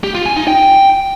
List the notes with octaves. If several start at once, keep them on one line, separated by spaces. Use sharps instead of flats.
G4
F4
G#5
D#4
G5